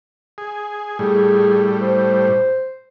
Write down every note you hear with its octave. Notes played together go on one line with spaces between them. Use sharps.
G#4
A2 G3 G#4
C5